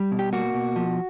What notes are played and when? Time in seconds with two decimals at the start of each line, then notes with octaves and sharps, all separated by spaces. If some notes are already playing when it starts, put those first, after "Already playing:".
Already playing: G3
0.12 B2
0.19 G4
0.33 A#3 F#4
0.54 B2
0.76 F3